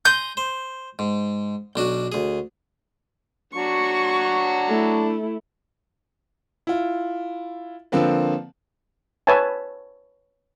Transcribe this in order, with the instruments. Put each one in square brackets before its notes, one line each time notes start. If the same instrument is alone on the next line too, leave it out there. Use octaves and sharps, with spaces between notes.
[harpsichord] G#5 A#5 C6 [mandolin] G6
[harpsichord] C5
G#2
B1 D4 F#4
D2 G#4
[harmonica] F#3 D4 F#4 [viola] C#6
[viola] A3 E4
[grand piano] E4 F4
D3 F3 A#3 C4 B4
[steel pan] B4 C#5 E5 G#5 A5